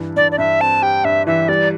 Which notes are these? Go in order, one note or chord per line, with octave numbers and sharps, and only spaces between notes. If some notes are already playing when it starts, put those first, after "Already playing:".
Already playing: G2 E3
G2 D5
D5
G2 E5
C4 A5
G4 G5
G2 E5
E3 E5
G3 D5